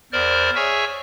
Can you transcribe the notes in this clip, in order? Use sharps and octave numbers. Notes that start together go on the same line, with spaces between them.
E2 A#4 C5 D5 F6
G#4 C#5 E5 G#5 C#6 E6